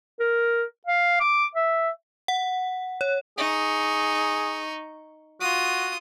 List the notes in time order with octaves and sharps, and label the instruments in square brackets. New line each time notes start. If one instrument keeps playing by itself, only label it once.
[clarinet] A#4
F5
D6
E5
[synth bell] F#5
C#5
[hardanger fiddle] D#4 C#6 [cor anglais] G#4
[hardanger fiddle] F4 D#6 [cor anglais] F#4